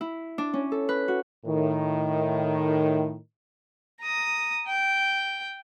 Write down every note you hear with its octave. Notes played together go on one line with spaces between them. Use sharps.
E4
D4
C#4
A4
B4
F#4
A2 D#3
A#5 D#6
G5